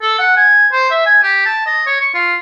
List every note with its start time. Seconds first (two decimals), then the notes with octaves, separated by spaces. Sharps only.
0.02 A4
0.19 F#5
0.36 G#5
0.72 C5
0.90 E5
1.06 G#5
1.23 G4
1.46 A5
1.66 D#5
1.86 C#5
2.01 C#6
2.14 F4